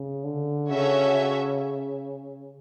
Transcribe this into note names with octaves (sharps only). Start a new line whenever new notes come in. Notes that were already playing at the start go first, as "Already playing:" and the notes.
Already playing: C#3
D3
C#3 C#4 F#4 A4 C#5 E5